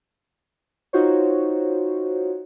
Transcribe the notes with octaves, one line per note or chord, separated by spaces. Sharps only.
D#4 F4 F#4 C5 C#5